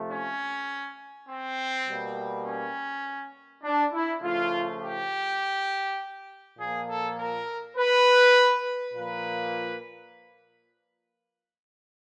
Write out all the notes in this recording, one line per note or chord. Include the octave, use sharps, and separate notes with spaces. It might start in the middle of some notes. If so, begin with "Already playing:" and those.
Already playing: C3 F3 A3
C#4
C4
B2 G3 A#3
C#4
D4
E4
C#3 F3 A3 F4
G4
A#2 F3 A#3 G#4
A4
A#4
B4
A#2 F3 A#3 B4